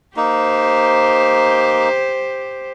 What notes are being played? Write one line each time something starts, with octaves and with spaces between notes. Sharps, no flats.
A#3 D#4 G4 C5